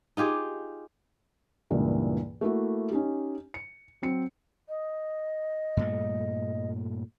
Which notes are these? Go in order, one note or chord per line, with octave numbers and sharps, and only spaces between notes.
D#4 F4 G4 G#4
C#2 G2 A#2 E3 A#3
A3 A#3 E4 F#4
C#4 D#4 G4
C#7
F#3 C4 C#7
D#5
G2 A#2 A3